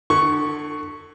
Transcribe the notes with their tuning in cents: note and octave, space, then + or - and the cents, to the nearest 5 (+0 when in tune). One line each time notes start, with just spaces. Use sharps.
D3 +35 A4 +0 C#6 +0